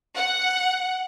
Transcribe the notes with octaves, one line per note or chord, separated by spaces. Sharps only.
F#5